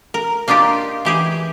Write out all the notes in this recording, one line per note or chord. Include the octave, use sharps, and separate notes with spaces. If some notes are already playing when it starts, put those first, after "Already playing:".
A#4
A#3 D4 D#4 F4 G4
E3 G4 G#4